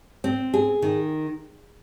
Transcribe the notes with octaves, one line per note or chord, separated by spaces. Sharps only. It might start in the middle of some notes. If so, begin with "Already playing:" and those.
C4
G#4
D#3